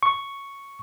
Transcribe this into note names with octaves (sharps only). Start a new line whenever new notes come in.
C#6